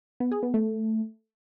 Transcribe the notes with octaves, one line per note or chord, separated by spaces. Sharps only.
B3
G#4
B3
A3